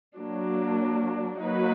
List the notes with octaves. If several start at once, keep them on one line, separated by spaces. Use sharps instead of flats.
F#3 A#3 D4
F#3 A#3 D#4 F#4 B4